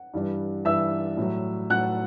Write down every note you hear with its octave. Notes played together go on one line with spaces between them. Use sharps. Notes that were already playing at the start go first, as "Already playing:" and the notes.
Already playing: F#5
G2 E3 G3
G2 E3 G3 E5 E6
A2 F#3
A2 F#3 F#5 F#6